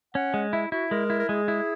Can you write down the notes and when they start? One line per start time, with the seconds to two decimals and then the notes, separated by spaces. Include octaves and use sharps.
0.15 C#4 F#5
0.34 G#3
0.53 E4 E5
0.72 E4 F#4
0.91 G#3 A#4
1.10 E4
1.19 A#4
1.29 G#3 G#4
1.48 E4